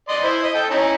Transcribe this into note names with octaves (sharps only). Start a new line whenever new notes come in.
D5 D#5 C6
E4 C5
D#5
A4 G5
C#4 D#4 E4